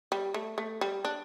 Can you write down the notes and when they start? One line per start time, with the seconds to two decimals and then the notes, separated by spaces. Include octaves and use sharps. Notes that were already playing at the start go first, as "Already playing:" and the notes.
0.12 G3
0.34 A3
0.58 A3
0.81 G3
1.05 D4